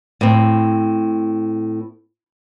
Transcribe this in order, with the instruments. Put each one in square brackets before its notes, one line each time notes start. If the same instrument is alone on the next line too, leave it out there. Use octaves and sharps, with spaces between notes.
[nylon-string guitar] A2 C4